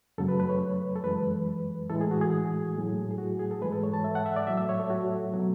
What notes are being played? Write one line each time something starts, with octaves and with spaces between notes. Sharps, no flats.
F#2 C#3 F#3 A3 A4
B4
B4
C#5
A4
F#2 E3 G#3 B4
A2 E3 G#3 A4
G#4
F#4
G#4
A2 F#3 A3
G#4
F#4
G#4
A4
G#2 E3 G#3 B4
A4
C#5
A5
E5
F#5
E5
D5
A2 F#3 A3 E5
E5
C#5
A4
F#4
B2 F#3 A3